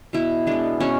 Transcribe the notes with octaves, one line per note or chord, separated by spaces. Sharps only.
B2 E4
G#3 B3 D4
B2 C#4